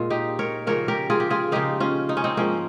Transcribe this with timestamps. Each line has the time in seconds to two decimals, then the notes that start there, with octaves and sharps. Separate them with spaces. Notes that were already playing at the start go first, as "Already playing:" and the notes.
Already playing: A#2 G#3 F4
0.10 D#4 G4
0.39 A#4 C#5
0.67 C#3 F3 A#3 A#4 C#5
0.88 G4 A#4
1.10 F4 G#4
1.20 G4
1.30 F4 G#4
1.52 C#3 F3 A#3 D#4 G4
1.80 C#4 F4
2.09 D#4
2.17 C#4
2.24 C4 D#4
2.37 G#2 F3 A#3 C#4